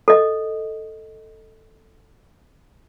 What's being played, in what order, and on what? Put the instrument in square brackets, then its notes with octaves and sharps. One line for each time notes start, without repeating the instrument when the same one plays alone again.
[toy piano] A4 D#5